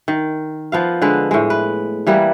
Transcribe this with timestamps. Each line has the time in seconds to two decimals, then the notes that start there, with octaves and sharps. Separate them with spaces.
0.08 D#3
0.72 F3 B3 F5
1.02 D3 G#3 B4
1.31 A2 G#3
1.50 B4
2.07 E3 G3 A#3 B3